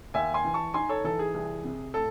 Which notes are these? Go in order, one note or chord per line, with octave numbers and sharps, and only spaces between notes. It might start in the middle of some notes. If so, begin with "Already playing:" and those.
D#2 E5 G#5
G#5 C6
E3
A5 C#6
D#4 G#5 C6
A4 C#5
E3 A4
G#4
C2
C3
A2 A4